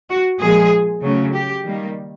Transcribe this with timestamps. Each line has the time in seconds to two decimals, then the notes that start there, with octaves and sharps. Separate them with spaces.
0.10 F#4
0.41 A#2 F3 G#3 G#4
1.02 C#3 F#3 A3 C#4
1.33 G4
1.64 D#3 G3 A#3